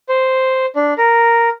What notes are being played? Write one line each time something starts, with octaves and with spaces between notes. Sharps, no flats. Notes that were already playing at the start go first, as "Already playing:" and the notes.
C5
D4
A#4